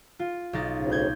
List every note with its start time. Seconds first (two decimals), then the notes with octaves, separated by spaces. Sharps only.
0.19 F4
0.53 B1 D#4 A6
0.77 D2 A2 C#3
0.91 G6 G#6